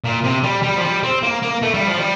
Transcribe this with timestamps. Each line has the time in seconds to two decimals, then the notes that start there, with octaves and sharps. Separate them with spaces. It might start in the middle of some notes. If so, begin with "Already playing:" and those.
0.04 A#2
0.24 C3
0.44 G3
0.63 G3
0.77 F3
0.84 G3
1.03 C4
1.23 A#3
1.42 A#3
1.62 A3
1.74 G3
1.87 F3
1.99 G3